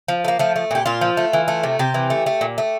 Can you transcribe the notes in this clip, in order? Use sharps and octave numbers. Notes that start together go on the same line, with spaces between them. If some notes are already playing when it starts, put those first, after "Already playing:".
F3
A3
A#3
F3 A3
A3
A#2 G4
A#2 F4
F3
A3
E3
A3
C3
C3 G4
E3
A3
A3
A#2
A3